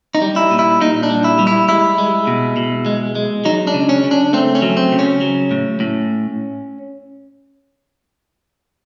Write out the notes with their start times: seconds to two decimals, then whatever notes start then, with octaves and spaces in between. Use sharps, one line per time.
0.15 D#4
0.22 G3
0.36 E4
0.51 A#2
0.59 E4
0.81 A#2 D#4
1.03 D4
1.10 G3
1.24 E4
1.39 G3
1.47 E4
1.69 G#3 E4
1.98 G#3
2.27 B2
2.57 B2
2.86 G#3
3.15 G#3
3.45 F#3 D#4
3.67 D4
3.74 C#3
3.89 C#4
4.04 C#3
4.11 D4
4.33 A3 C4
4.55 C#4
4.62 F#3
4.77 C4
4.92 C#3
4.99 C#4
5.21 F#3
5.51 A2
5.80 A2